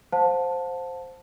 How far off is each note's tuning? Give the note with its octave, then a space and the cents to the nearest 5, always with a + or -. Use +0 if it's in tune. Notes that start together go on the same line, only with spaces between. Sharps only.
C5 +0 F5 +45 A5 +0